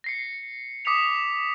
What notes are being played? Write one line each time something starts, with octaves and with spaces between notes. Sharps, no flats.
A#6 C7 C#7
D6 D#6 B6 C#7 F7